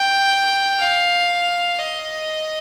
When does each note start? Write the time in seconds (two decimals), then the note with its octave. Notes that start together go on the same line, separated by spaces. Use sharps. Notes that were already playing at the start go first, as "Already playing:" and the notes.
Already playing: G5
0.80 F5
1.79 D#5